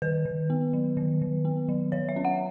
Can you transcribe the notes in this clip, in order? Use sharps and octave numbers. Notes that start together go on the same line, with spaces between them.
D#3 B4
D#3
B3
F#3
D#3
D#3
B3
F#3
F#3 C#5
E5
C#4
F#5